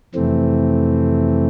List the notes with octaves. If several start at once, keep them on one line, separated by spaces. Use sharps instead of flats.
F2 C3 E3 A3 C4